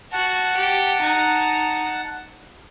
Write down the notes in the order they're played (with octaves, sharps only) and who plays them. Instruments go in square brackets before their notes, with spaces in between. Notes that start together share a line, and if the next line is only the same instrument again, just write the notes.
[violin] F#4 [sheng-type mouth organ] F#5 A5
[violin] G4
D#4